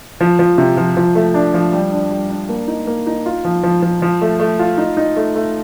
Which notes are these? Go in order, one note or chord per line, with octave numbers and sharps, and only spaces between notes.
F3
F3
C3
F3
F3
A3
D4
F3
G3
D4
G3
D4
A#3
D#4
A#3
D#4
F4
F3
F3
F3
F3
A3
A3
F4
D#4
D#4
A3
A3